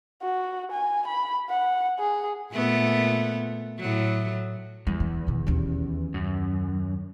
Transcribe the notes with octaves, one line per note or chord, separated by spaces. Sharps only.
F#4
G#5
B5
F#5
G#4
A#2 A3 B3
A2 F#3
E2 G3
E3
B2 D#3
D#2 C#4
F#2